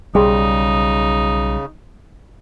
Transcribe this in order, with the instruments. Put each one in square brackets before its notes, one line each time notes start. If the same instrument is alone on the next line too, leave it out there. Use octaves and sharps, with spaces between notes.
[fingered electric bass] B1 G3 [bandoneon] C#3 [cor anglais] D#4 [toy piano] G#4 C6